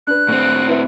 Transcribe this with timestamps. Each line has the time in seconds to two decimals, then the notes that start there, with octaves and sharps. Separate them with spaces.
0.07 D4 B4 F#6
0.29 A2 C4
0.67 E4 B4 E5